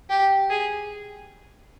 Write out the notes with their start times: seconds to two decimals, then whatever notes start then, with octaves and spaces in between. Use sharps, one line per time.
0.10 G4
0.50 G#4